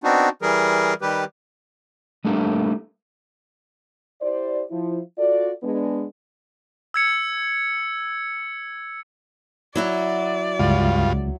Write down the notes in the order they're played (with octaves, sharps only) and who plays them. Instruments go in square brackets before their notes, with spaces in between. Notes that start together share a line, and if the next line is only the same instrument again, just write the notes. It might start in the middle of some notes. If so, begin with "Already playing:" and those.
[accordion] B3 C4 D4 D#4 F#4
E3 G3 G#4 A#4
D#3 G3 G4 B4
[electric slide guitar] G3 A3 A#3 D4 G4
[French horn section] E4 G4 C5 D5
F3 E4
F4 F#4 A4 D5
G#3 B3 D4
[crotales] E6 G#6 C#7
[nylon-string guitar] F#3 E4 F#4 [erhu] D5
[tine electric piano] C#2 [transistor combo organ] G2 F4